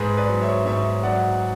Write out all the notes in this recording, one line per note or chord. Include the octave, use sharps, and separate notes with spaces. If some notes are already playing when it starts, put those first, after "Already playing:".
Already playing: G#2 G#4 B4
B4 D5
F#3
C#5 E5
G#2 C#5 E5
F#3 D5 F#5